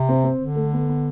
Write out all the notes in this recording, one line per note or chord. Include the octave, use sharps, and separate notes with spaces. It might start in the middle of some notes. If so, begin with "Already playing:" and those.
Already playing: C3
C4
C4
D3
A3
B3
B3